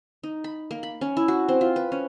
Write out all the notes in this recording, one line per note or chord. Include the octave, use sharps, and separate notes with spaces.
D#4
B5
A#3
B5
C#4
E4
F#4
C4
F4
B4
C#4